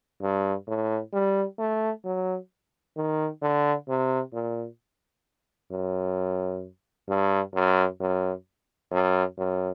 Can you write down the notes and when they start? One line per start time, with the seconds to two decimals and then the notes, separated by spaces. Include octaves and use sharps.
0.22 G2
0.67 A2
1.13 G3
1.59 A3
2.05 F#3
2.97 D#3
3.42 D3
3.88 C3
4.33 A#2
5.71 F#2
7.08 G2
7.54 F#2
8.00 F#2
8.92 F#2
9.38 F#2